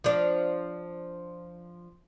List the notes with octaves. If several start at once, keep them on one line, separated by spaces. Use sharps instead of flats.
F3 D4